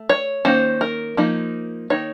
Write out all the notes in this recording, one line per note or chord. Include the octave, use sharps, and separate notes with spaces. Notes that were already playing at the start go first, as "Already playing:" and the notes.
Already playing: A3
C#5
D#3 A#3 C#4 C5
A#4
F3 A#3 D#4
D#3 A#3 D#4 C#5